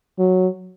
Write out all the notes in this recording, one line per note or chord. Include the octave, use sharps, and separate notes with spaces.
F#3